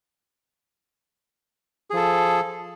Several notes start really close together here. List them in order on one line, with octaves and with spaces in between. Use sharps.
G#4 F3 A4